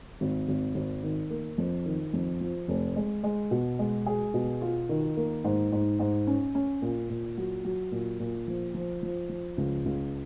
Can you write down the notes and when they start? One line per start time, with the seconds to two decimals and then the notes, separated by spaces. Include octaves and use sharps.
0.21 G#1
0.48 G#1
0.75 G#1
1.03 D#3
1.30 A#3
1.58 F2
1.86 D#3
2.13 F2
2.41 F3
2.68 F1
2.96 G#3
3.23 G#3
3.51 B2
3.79 G#3
4.06 G#4
4.34 B2
4.62 F4
4.89 D#3
5.17 A#3
5.44 G#2
5.72 G#2
5.99 G#2
6.27 C#4
6.55 C#4
6.82 A#2
7.10 A#2
7.37 F#3
7.65 F#3
7.92 A#2
8.20 A#2
8.48 F3
8.74 F3
9.03 F3
9.29 F3
9.58 C#2
9.85 C#2